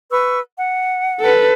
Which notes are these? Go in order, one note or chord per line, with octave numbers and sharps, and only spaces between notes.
B4 C#6 E6
F#5
A4 B4